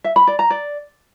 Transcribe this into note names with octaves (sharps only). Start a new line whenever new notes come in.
E5
B5
D5
A#5
D5